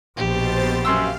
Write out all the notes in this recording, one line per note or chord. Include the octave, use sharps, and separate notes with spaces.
A#1 B2 G4 C5 A6
F#2 F5 C6 E6